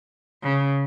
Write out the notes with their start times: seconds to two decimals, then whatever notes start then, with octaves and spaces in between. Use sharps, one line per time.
0.43 C#3